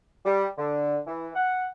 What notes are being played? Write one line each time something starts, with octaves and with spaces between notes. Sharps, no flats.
G3
D3
E3
F#5